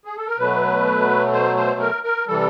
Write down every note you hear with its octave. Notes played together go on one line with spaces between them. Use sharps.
G#4
A4
A#4
B2 F#3 A3 B4
C5
C5
A#4
A#4
C3 E3 G3 A4